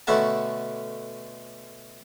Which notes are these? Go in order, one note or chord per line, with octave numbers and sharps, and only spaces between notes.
B2 D3 A3 C#4 F#5 A5